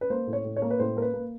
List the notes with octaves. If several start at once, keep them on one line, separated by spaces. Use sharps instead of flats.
B4
A#3 C5
A2
C#5
A2
C#5
A#3
B4
A2 C5
A#3 A#4
B4
A#3